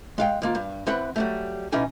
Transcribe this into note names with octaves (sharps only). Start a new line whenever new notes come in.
G#3 F5 G5
D#2 A#3 F4
G2
E3 C4 B4 F#5
F#3 G3 A3
B2 E3 C#4 D#4 G#5